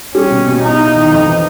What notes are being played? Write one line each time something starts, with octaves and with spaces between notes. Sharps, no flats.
G3 C#4
B2
B2
D#4 E4
E4
D#3
F2
E3